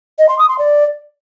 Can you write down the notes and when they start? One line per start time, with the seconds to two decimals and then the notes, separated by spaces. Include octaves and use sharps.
0.19 D#5
0.29 C6
0.39 D#6
0.49 C6
0.59 D5